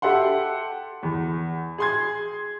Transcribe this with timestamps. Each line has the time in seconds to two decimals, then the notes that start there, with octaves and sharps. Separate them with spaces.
0.02 G4 A4 E5 F#5 C6
1.03 E2
1.78 G#4 C6 G#6